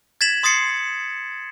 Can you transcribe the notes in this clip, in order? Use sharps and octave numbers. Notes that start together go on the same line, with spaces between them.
G#6 A6 B6 E7 F#7
C6 D#6 A6 C7 C#7